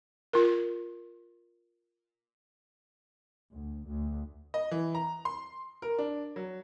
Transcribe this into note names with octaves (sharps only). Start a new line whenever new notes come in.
F4 A#4
D2
D2
D#5
E3
A#5
C6
A#4
D4
F#3